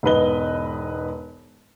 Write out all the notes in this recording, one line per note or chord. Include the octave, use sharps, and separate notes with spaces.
E1 G#2 B3 B4 D#5 G7